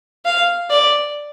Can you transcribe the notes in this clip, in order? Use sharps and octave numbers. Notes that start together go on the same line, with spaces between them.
F5
D5